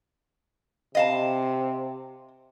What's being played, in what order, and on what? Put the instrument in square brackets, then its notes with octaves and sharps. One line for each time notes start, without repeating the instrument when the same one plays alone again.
[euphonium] C3 [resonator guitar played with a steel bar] D#5 F5 A5